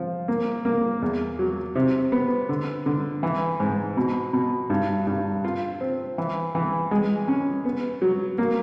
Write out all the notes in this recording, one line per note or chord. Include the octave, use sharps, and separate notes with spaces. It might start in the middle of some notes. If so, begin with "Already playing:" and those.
Already playing: F3
A#3
A#3
E2
F#3
C3
B3
D3
D3
E3
G#2
B2
B2
G2
G2
F4
C4
E3
E3
G#3
C#4
B3
F#3
A#3